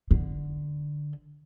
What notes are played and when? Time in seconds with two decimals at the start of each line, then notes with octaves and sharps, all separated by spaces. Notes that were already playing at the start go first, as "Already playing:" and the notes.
0.11 D3